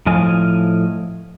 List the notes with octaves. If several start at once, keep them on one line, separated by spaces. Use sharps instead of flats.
A2 F3 D#5 F5 G#5